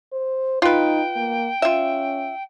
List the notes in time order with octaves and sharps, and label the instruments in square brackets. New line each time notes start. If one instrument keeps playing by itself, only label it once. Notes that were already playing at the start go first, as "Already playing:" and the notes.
[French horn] C5
[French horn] D#4 [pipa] F4 B4 [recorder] G5
[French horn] A#3
[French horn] C#4 [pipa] F4 E5